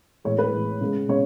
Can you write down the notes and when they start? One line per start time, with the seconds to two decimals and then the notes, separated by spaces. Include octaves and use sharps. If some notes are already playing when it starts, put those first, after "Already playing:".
0.24 A2 E3 G#3 C#5
0.38 B4
0.53 A2 E3 G#3
0.81 C#3 G#3
1.09 C#3 G#3 C#5